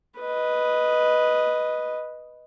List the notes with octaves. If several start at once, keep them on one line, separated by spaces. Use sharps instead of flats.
B4 D#5